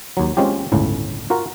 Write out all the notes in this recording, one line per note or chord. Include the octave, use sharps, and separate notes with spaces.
D#2 F#3
G#3 C4 C#4 F4 G4
G1 C#2 A2
F4 F#4 A#4